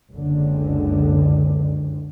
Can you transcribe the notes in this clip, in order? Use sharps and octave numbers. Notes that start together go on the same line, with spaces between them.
F#1 C#2 D3